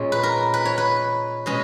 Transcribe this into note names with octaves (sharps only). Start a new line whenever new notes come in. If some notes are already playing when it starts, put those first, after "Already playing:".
Already playing: A#2 G#3 C#4 C#5
B4
A#4
B4
C#5
B4
B2 G#3 C#4 D#5